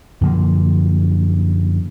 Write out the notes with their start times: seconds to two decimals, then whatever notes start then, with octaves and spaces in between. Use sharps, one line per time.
0.21 F#2 D3 F3 A#3